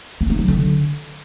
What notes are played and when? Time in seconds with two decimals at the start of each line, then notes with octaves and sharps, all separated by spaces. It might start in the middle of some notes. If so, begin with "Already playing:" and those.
0.21 A#3
0.30 D#4
0.39 F#3
0.48 D3